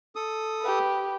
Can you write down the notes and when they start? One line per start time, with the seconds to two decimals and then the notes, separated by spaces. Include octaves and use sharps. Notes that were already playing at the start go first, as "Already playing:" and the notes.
0.15 A4 D#6
0.61 G4 B4